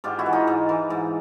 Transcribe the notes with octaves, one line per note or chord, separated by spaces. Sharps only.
G#2 F4 G4
E4 F#4
E3
D#4 F4
G#2
E3
G#2